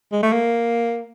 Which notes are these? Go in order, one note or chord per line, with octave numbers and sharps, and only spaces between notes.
G#3
A3
A#3